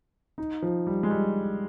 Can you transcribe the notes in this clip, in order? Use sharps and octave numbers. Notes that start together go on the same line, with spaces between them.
D#4
F3
G3
G#3
G3